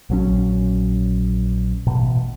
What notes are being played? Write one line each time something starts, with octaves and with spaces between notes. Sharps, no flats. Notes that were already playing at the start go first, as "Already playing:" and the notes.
A#1 F#3 C#4
A1 B2